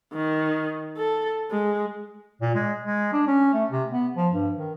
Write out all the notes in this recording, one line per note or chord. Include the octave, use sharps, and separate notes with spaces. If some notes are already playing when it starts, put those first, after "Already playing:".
D#3
A4
G#3
A#2
G#3
G#3
D4
C#4
A3
C3
B3
F3
G2
D#3